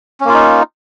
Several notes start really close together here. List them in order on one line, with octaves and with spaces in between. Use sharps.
C#4 A#3 F4 D#4